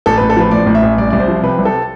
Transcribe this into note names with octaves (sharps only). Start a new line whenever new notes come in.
A1 A4
B4
A1
A4
F3 B4
A2 D5
A1
E5
A1
C2 D5
C2 D5
C5
F3
C3 B4
C2
A4